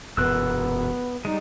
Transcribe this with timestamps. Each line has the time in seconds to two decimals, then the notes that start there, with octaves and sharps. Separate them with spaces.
0.17 E1 F#2 A#2 B3 E6 F#6
1.25 G3 G#3 D#4